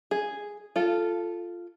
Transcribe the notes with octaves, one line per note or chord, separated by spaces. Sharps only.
G#4
F4 A4